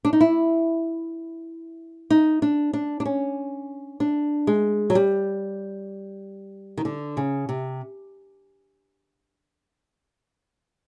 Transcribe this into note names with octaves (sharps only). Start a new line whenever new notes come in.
D4
D#4
E4
D#4
D4
D4
D4
C#4
D4
G#3
F#3
G3
D#3
D3
C#3
C3